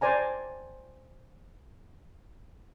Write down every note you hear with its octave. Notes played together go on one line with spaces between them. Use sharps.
C5 D5 G#5 A#5